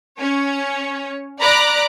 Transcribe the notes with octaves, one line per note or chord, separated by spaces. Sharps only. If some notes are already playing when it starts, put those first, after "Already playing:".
C#4 C#5
D5 A#5 B5 D6 F#6